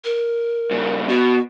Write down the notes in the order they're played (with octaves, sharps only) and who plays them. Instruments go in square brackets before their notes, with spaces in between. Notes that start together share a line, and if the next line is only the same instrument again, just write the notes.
[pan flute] A#4
[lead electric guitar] G2 C#3
[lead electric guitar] B2 [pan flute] F#4